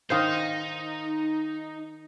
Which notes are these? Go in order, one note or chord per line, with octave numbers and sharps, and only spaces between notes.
D#3 D#4 F4 C5